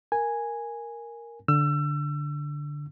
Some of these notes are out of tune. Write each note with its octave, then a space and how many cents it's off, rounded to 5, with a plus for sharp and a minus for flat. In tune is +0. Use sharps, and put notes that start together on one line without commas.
A#4 +0 G#5 -5
D3 -5 E6 +30